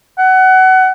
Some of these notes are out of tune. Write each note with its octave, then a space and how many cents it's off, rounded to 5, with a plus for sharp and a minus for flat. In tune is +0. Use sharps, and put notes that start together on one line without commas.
F#5 +20